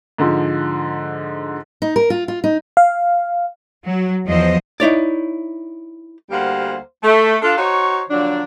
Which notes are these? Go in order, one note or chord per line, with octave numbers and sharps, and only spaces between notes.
G#2 D3 F3
D#4
A#4
F4
F4
D#4
F5
F#3
E2 F3 F#3 C5 D#5
D#4 E4 C#5 D5
D2 G3 A#3 C5 F5 F#5
A3
D4 F4 A4
D#4 F#4 C5 C#5
D3 F3 F#3 A#3 D4